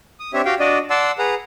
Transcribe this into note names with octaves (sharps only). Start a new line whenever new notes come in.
D#6
C4 D4 G4 C#5 E5
F#4 G4 F5 G5
D4 F#4 D5 D#5
D5 F#5 A5 C6 E6
G#4 B4 F#5 A#5